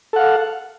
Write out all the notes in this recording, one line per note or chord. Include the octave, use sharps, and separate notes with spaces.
A4 F5 F#5